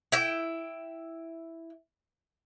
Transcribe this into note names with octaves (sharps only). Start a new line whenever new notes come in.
E4 G5